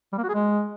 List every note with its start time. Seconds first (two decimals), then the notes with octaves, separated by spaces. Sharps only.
0.12 G3
0.18 A#3
0.23 F#4
0.29 G#4
0.34 G#3